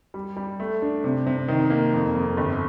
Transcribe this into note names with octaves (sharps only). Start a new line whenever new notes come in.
G3
G3
A3
D4
C3
C3
D#3
A#3
F2
F2
G1